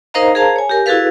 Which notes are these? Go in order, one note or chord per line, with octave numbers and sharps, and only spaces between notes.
D#4 A#4 C5 D#5 F5 A#5
G#4 A#4 C5 F5 A5 A#5
C#5 G#5
G4 A#4
E4 F#4 G#4 A4 B4 F5